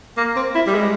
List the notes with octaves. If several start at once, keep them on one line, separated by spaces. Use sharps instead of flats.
A#3
C4
E4
G3
G#3